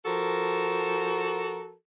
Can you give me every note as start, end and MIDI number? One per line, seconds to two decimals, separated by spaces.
0.05 1.73 53
0.05 1.73 66
0.05 1.73 69
0.05 1.73 70